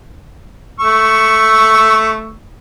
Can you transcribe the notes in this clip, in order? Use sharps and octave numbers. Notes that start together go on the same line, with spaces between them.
A3 C#6 E6